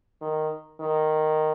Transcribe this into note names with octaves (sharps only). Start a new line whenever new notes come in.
D#3
D#3